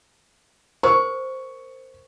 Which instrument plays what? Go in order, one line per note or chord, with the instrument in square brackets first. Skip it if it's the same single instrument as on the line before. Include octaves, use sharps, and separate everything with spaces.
[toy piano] A#4 C5 [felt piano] C#6